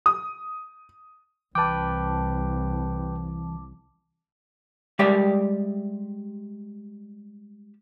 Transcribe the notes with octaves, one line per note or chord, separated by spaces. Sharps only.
D#6
C2 E3 B4 G5 A5 D6
G3 G#3 G4 D5 E5